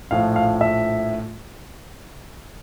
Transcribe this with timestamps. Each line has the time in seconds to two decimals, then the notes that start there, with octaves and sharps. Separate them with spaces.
0.11 A#1 A2 F3 F5
0.36 F5
0.61 E5